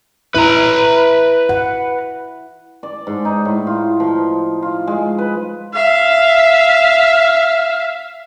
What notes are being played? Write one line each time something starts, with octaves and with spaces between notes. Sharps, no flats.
E4 B4 E5 A#5
F#5
D5
G#2
D#4
A2
F4
F3
F4
G#3
B4
E5 F5